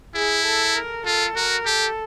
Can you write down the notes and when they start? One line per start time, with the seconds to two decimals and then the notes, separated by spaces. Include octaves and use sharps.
0.14 E4 G#4
0.45 A4
0.75 A#4
1.06 F4 A4
1.36 F#4 A#4
1.66 G4 A4